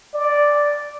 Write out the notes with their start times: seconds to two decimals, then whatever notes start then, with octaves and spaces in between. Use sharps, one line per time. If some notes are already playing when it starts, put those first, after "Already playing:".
0.14 D5